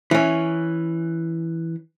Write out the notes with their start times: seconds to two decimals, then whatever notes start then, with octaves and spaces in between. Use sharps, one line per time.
0.11 E3 C#4